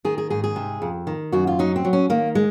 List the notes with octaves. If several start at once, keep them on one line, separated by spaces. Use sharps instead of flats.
D#3 G#4
G#4
G#2 G#4
G#4
C3
F2
D#3
F#2 F#4
F4
F#3 D#4
C4
F#3
C#4
D#3 A#3
G#3